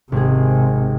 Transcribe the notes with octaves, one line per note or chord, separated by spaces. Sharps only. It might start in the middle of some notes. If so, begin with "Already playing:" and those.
G#1 C3 G#4